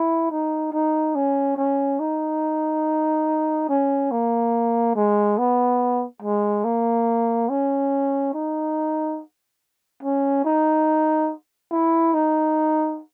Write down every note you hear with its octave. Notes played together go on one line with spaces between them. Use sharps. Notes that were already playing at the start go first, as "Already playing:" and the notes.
Already playing: E4
D#4
D#4
C#4
C#4
D#4
C#4
A#3
G#3
B3
G#3
A#3
C#4
D#4
C#4
D#4
E4
D#4